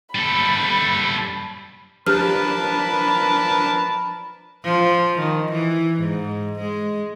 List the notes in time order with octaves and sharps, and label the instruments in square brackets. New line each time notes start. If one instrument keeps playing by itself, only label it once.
[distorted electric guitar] G3 A4 [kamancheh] B5
[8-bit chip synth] F3 D4 B4 [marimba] G4 F6 [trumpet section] A#4 A5 [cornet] B5
[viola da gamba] F3
D#3
E3
G#2
G#3